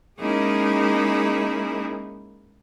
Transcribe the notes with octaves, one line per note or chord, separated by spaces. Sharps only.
G#3 A#3 C#4 D#4 E4 G#4